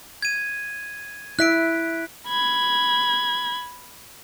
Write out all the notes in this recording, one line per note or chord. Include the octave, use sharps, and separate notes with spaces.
G#6 D#7
E4 E5 F#6 B6 D7
B5 G#6